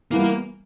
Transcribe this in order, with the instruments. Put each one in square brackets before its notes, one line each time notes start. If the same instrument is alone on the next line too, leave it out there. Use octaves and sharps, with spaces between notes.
[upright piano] E3 G3 B3 [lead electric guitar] A#3